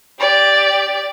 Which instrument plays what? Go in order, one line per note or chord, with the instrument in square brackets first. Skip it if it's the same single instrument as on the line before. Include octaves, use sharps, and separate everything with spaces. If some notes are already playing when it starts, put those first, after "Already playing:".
[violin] G4 D5